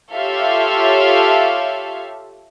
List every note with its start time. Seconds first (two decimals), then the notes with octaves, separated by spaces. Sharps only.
0.13 F4 G4 A4 C#5 E5 F5